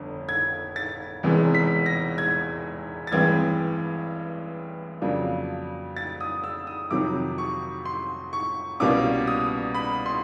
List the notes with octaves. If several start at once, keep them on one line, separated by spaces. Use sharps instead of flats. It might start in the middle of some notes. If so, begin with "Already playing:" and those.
Already playing: G1 F2 D3
G#6
A6
E1 E2 C3 E3 G#3
B6
A#6
G#6
A6
A1 G2 E3 G#3 C4 G#6
F2 C#3 F#3 A#3 D4
A6
D#6
E6
D#6
F2 C3 D#3 F#3 D6
C#6
C6
C#6
C2 B2 G3 A#3 C#4 D6
D#6
B5
C6